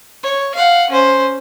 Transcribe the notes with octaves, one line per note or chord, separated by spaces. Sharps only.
C#5
F5 F#5
C#4 C5